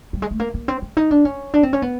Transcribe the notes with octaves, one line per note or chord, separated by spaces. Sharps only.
G3
G#3
A3
A#3
A#3
C4
C#4
D#4
D4
C#4
D4
C4
C#4
B3